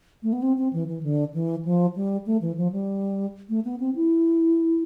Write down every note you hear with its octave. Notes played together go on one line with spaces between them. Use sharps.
A3
B3
C4
C4
E3
E3
D3
E3
F3
G3
A3
E3
F3
G3
A3
B3
C4
E4